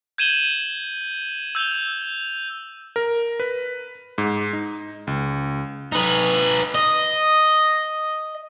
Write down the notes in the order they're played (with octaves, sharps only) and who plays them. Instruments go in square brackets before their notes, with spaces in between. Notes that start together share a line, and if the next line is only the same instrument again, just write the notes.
[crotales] G6 G#6 D#7 E7 F#7 G7
E6 G6 F7 G7
[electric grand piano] A#4
B4
G#2
D#4
C#2
[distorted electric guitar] D#4 B4
D#5